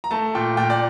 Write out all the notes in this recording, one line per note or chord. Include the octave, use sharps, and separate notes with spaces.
A#5
A3 A5
A#2 G5
A#2 G5
D5